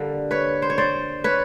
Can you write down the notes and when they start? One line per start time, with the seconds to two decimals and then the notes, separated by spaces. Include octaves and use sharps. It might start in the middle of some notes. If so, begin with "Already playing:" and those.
Already playing: D3 G3 A#3
0.31 B4 C#5
0.62 C5
0.70 C#5
0.78 C5 D5
1.24 B4 C#5